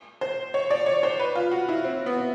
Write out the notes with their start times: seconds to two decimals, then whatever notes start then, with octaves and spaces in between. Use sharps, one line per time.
0.21 C5
0.54 C#5
0.70 D5
0.86 C#5
1.03 C5
1.19 B4
1.35 F4
1.51 F#4
1.69 E4
1.84 C4
2.06 B3